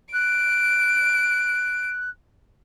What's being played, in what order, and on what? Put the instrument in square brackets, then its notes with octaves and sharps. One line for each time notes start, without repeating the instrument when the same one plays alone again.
[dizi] F#6 [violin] D7